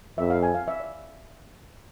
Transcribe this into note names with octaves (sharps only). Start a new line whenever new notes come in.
F2 E5
F5
G#5
F5
E5
D5